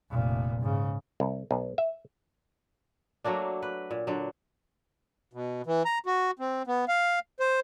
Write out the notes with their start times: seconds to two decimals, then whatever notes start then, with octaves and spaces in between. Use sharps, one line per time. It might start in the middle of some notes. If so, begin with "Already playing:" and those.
0.10 F1 A#2
0.60 G#2 C#3
1.20 C2
1.51 B1
1.78 E5
3.24 F#3 A3 A#3 D4
3.62 B4
3.91 A#2
4.07 D3 F#3
5.33 B2
5.67 E3
5.85 A#5
6.06 F#4
6.39 C4
6.67 B3
6.88 F5
7.40 C5